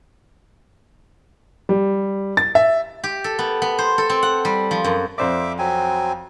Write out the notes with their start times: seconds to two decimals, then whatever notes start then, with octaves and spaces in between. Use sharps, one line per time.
1.69 G3
2.37 A6
2.55 E5
3.04 G4
3.24 A4
3.39 B3
3.62 B3
3.79 C5
3.98 A4
4.10 C4
4.23 F#5
4.45 G3
4.71 F3
4.84 F#2
5.18 F2 C5 D5 E5 D6
5.59 F#3 C4 G#5